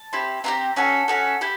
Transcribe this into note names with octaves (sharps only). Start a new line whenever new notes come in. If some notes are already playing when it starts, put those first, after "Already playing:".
Already playing: A5
C4 E4 G4
C4 E4 G4 A#5
C#4 F#4 A4
C#4 F#4 A4
E4 G4